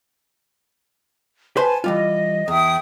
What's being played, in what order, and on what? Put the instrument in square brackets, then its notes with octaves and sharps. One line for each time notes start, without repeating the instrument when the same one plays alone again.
[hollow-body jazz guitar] B4 C5 [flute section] G#5 A5
[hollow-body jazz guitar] E3 G3 F4 [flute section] D#5
[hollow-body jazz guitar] E2 [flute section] E5 G5 D#6